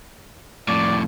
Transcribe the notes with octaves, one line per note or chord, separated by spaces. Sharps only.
F2 A2 D5